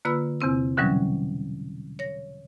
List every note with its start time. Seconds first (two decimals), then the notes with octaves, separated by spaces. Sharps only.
0.05 D3 A#3 F4 B4 B5 E6
0.41 E2 C3 C4 E6
0.77 B2 D3 E3 F#3 G3 C#4
1.99 C#5 A#6